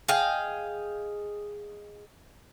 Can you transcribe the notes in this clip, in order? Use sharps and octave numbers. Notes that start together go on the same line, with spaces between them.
G#4 D#5 F5 G5